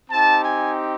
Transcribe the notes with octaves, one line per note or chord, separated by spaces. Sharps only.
C4 D#4 G4 A5
G#5